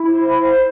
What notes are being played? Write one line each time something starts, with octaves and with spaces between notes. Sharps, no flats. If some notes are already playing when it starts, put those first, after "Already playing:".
Already playing: E4
C5
C5